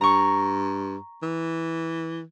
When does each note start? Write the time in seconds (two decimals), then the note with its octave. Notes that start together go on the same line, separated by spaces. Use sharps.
0.01 G2 A#5 C#6
1.23 E3